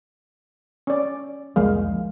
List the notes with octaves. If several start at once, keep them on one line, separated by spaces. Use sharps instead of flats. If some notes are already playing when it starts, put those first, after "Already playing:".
C#4 D5
F1 C2 F3 G#3 A#3 F5